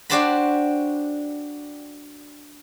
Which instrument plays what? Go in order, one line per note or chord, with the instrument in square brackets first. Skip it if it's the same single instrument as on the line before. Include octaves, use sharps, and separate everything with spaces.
[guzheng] D4 F#4 G4 C5 A5 B5